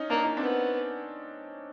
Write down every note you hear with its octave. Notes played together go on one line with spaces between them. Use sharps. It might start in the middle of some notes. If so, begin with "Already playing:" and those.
Already playing: C#4 D#4
A#3 D4
D#4
B3 C4 D4